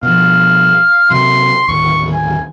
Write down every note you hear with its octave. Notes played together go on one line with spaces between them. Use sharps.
B2 F3 F5
C3 F#3 C6
D1 D#2 C#6
G#5